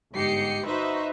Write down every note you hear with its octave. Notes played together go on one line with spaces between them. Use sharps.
G1 G#2 G4 D#5 C7 C#7
D#4 F#4 B4 C5 E5